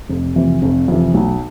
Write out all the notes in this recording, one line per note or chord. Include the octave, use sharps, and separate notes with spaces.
F1
F2 C3 E3
F1
F2 C3 E3
B1